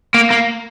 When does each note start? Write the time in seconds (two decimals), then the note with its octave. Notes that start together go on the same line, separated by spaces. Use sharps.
0.14 A#3
0.31 A#3